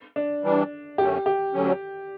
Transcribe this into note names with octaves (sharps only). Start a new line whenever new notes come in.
D4
E3 G3 D4
F#2 D3 A3 C#4 G4
G4
D2 D3 F#3 C#4